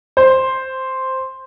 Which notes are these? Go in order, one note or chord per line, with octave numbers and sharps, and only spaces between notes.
C5